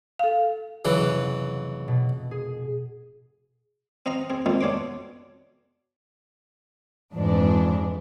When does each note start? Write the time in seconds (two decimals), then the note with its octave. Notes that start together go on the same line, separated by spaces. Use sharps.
0.19 A4 F5
0.85 C#3 E3 F#3 F#6
0.98 F1 D#5
1.88 B2
2.31 G#4
4.06 C4 D#5 F5 A#5
4.30 C4 G#4
4.46 F2 A#2 G#3 C4 D#4
4.61 B2 D4 C#5 C6 D6
7.13 F2 G#2 E3 D4